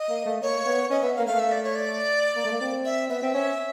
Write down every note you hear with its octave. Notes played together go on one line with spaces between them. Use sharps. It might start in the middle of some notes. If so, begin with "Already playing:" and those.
Already playing: D#5
A#3
A3
A#3 C#5
B3
C#4 D#5
B3 E5
F5
A#3
A3 F5
E5
D5
C#5
D5
A#3
A3
A#3
C4
E5
B3 E5
C4
C#4